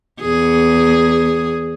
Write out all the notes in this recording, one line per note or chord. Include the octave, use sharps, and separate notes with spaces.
E2 G#4